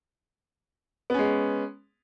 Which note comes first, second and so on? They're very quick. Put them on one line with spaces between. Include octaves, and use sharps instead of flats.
B3 C#4 G#3